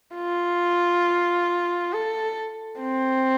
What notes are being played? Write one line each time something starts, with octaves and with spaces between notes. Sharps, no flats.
F4
A4
C4